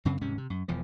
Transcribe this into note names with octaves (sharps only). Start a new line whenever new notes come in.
F#2 C#3 C4
D#1 G#2 C3 C#4
C3
F#2
E1 E2 F3